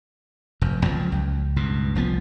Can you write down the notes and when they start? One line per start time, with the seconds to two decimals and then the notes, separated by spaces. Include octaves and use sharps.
0.62 F1 F#2
0.83 C#2 C#3 F3 F#3
1.12 C#2
1.56 C#2 G2 B2
1.95 F1 C2 F3 B3